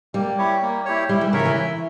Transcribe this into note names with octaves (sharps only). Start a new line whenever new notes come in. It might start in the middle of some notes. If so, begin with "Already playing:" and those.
G3 A#3
E4 G4 C#5
A#3
E4 G4 C#5
G3 E4
E3
C#3 A#4 C#5 E5
F3
E3
E4